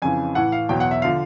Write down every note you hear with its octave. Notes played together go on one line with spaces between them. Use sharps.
F2 C#3 E3 G#5
A2 E3 F#5
F5
E2 B2 F#3 G5
F#5
E5
D3 F3 F5